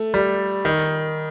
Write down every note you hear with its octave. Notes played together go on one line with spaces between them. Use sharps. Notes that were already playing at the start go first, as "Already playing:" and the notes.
Already playing: A3
G3
D#3